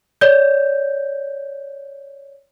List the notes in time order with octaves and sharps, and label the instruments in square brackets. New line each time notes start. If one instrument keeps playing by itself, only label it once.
[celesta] C#5 D5 G6